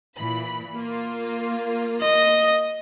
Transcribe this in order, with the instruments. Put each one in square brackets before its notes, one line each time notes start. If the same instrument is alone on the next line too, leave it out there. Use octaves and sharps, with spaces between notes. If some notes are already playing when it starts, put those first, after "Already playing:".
[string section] A#2 E3 B5
A#3 F4
[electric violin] D#5